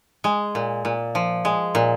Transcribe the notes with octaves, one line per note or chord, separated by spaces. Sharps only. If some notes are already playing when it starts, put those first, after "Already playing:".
G#3
A#2
A#2
F3
G#3
A#2